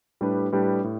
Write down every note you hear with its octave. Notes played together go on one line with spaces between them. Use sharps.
A2 G3 D4 G4 B4
A2 G3 D4 G4 B4
A2